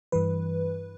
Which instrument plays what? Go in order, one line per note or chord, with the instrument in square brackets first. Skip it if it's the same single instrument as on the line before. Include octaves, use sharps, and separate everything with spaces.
[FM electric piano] G2 E3 B4